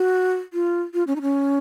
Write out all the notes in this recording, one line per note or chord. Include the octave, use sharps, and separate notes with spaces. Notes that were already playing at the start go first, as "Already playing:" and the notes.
Already playing: F#4
F4
F4
C#4
D#4
C#4